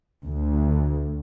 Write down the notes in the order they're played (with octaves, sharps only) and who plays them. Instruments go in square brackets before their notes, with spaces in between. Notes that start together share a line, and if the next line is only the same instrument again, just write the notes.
[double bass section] D2